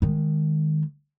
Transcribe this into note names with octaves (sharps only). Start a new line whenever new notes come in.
D#3 G#3